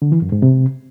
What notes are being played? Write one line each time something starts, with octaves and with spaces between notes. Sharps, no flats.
D3
E3
F#2
G#2
C3